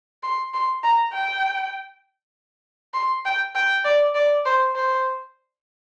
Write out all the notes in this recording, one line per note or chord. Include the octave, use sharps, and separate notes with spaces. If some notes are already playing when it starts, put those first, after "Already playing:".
C6
C6
A#5
G5
C6
G5
G5
D5
D5
C5
C5